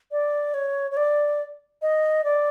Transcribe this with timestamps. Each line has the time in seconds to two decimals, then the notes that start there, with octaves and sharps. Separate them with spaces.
0.11 D5
0.54 C#5
0.91 C#5
0.97 D5
1.82 D#5
2.24 D5